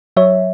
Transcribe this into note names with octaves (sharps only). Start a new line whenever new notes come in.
F#3 C#5 E5